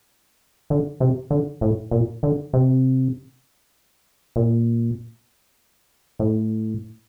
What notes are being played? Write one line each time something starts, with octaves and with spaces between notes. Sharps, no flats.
D3
C3
D3
A2
A#2
D3
C3
A#2
A2